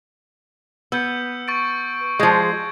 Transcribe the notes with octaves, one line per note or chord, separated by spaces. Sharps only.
B3 E6 G6 C#7
C#6 A6 D7
F3 G#3 G6 G#6